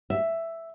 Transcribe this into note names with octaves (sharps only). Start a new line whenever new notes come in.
E5